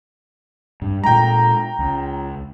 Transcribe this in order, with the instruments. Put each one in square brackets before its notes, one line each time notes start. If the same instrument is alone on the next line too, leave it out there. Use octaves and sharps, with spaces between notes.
[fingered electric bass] G2
[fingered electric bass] A#2 G#3 [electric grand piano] G5 A#5
[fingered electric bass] C#2